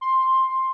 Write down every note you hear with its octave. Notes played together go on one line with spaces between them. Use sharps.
C6